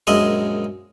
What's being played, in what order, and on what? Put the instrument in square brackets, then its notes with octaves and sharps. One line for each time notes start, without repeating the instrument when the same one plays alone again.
[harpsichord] A#1 F#2 G#3 D#5 E5